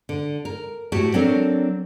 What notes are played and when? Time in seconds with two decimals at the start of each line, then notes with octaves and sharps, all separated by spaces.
0.09 D3
0.45 A#4
0.92 A2 F#4 G4 A5
1.14 F#3 C4 D4 A4 A#4